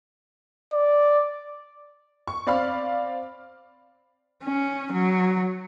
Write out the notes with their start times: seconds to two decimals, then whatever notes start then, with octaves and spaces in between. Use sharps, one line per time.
0.73 D5
2.27 C#6
2.47 C4 D5 F5 B5 F6
4.43 C#4
4.92 F#3